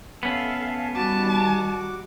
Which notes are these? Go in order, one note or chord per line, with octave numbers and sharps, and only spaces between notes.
B3 C#4 A4 E5 F5 A5
D#3 G3 F#4 A5 D6